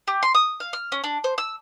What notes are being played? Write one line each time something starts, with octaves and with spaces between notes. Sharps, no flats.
G4
C6
D#6
F5
F6
C#4
D4
C5
E6